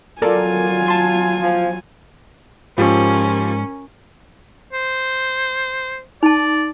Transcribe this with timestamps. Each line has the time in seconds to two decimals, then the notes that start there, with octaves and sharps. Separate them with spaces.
0.22 F#3 F4 A4 A#4 D5 G#5
0.86 A5 C6 G#6
1.41 F3
2.78 G#2 F3 C#4 F4 G4 A#4
4.73 C5
6.23 D#4 D5 A5